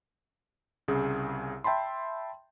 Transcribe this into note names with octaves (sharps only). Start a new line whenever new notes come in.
C2 C#3 G#4
E5 G5 A5 B5 C6